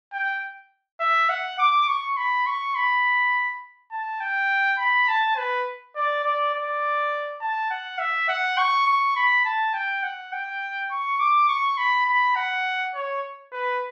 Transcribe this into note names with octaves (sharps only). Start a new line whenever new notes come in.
G5
E5
F#5
D6
C#6
B5
C#6
B5
A5
G5
B5
A5
B4
D5
D5
D5
A5
F#5
E5
F#5
C#6
C#6
B5
A5
G5
F#5
G5
C#6
D6
C#6
B5
B5
F#5
C#5
B4